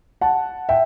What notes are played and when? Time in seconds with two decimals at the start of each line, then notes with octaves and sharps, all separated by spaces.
0.21 F#5 A5
0.69 E5 G5